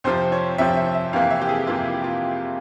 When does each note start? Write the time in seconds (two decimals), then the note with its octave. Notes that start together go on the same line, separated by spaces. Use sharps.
0.04 F2 C3 F3 C5
0.32 C#5
0.58 F2 C3 F3 E5
0.77 E5
0.94 E5
1.13 F2 C3 E3 A#3 F5
1.30 E5
1.42 G4
1.49 G#4
1.67 F2 C3 E3 A#3 F4
1.86 E4
2.04 F4